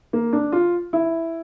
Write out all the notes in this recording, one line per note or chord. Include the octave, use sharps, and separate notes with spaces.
A#3
D4
F4
E4